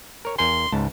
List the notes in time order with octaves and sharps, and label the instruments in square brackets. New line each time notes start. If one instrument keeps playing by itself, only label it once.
[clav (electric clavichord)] A#4 C#5
[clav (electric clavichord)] E2 A#4 G#5 [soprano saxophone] C6
[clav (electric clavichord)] C#2 G#2 A5